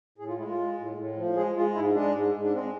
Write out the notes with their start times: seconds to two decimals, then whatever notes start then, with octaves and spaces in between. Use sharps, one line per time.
0.18 A2 G#4
0.28 F4
0.38 G#3 E4
0.49 F4
0.57 G#3
0.77 A2
0.96 A2
1.16 F3
1.35 G#3 G#4
1.55 G#3 F4
1.74 G#2 E4
1.94 G#3 D4
2.14 G#2
2.33 G#2
2.43 D4
2.52 G#3 C4